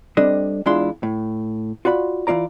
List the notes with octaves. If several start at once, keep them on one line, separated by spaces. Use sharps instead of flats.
G3 C4 D4 A4 D#5
E2 G#3 D4 E4 F4 C6
A2
F4 F#4 D5 B5
E3 G#3 F4 D5 A#5